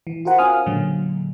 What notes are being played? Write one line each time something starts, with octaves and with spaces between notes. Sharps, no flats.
E3
F4 F#4 A#4 C5 F#5
C#4 F5 G#5 D#6 F6
A#2 D3 F#3 G#3